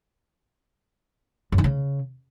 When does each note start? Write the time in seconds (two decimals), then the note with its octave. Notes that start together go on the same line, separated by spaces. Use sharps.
1.52 F#2
1.58 D#3
1.64 C#3